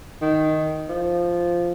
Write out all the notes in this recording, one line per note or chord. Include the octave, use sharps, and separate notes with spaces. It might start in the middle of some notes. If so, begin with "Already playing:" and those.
D#3
F3